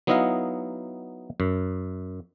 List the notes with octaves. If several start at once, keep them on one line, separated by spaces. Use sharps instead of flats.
F#3 B3 D#4 E4 D#5 F5
F#2